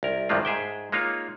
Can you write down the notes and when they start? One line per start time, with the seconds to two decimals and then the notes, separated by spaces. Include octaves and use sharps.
0.03 C2 A#4
0.29 C2 G2 D#3 G3 G#3 F4
0.45 G#2 G#4 E5 G5
0.92 G#3 A#3 D#4 F4 C#5